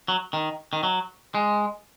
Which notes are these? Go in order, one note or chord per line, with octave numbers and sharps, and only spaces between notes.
F#3
D#3
D#3
F#3
G#3